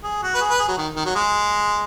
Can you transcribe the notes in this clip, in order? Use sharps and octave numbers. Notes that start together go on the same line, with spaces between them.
G#4
F#4
B4
G#4
B4
G#4
F#3
D#3
D#3
F#3
G#3